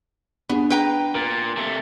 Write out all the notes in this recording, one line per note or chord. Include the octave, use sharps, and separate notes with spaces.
B3 D4 G#4
B4 G5 A#5
A#2 A#4
C3 A3